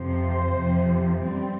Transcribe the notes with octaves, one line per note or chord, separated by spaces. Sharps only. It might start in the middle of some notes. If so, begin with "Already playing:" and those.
Already playing: F2 C3 F3 C5
F2 C3 F3
G2 G3 C4